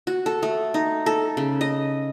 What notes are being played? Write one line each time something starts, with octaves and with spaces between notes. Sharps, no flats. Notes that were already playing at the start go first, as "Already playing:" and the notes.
F#4
A4
A3
D#4
A4
C#3
D#5